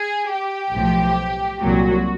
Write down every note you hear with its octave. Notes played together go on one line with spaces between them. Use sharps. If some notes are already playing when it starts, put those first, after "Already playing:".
Already playing: G#4
G4
B1 A2 F3
C2 A#2 F#3 F#4